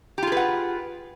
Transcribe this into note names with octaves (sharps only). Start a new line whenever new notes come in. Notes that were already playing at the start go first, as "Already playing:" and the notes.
F4 G4 G#4 B4 F#5